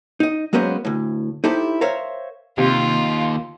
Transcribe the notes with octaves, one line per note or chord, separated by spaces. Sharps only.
D#4 D#5
F#3 G#3 A#3 B3 C#4 C5
D2 A2
D#4 E4 G4 A4 C5
A#4 C5 C#5 E5 F5
D#2 C3 F4